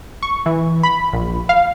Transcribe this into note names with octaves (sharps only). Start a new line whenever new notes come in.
C#6
E3
B5
A#1
F5